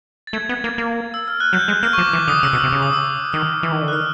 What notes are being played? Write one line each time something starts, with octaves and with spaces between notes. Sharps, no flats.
A6
A3 G#6
B3
A#3
A#3
E6
F6
F#6
F#3 G6
G#3 F#6
A#3 F6
C#6
F3 D6
E3 D6
D3 D#6
D#6
C#3 E6
B2 F6
E6
C3
C#3
D#6
E6
D#3 F6
E3
D#3
D3
F#6
D#3 F6